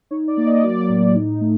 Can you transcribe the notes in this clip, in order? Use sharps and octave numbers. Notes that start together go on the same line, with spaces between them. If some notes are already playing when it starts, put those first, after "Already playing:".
D#4 C#5
D5
A#3
D#5
F#3 D5
A2
D#4
A3